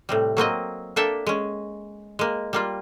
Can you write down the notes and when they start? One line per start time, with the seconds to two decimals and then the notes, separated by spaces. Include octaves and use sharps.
0.09 A2 C3 G3
0.37 F#3 A#3 C4 D#5
0.96 A#3 D4 A4 E5 G5 A5
1.27 G#3 C#4
2.19 G#3 A#3
2.53 G3 A#3 F4